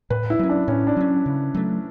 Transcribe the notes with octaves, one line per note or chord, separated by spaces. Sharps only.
A2 B4
E4
F#3 C#4
D4
A2 C#4
D4
F#3 C#4
C#3
F#3 A3